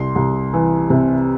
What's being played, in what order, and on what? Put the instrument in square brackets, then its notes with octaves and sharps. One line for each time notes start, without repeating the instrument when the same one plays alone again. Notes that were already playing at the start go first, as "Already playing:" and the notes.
Already playing: [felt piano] C2 C6
C2
E3
C3